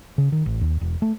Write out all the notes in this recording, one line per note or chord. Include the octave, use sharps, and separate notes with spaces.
C#3
D#3
A1
D#2
E1
A3